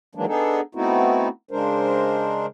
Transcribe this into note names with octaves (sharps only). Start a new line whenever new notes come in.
D#3 E3 F#3 G#3 A#3 D4
B3 D4 D#4 G#4 A4
A3 B3 C4 D#4 E4 F#4
C#3 G#3 D4 A#4 C5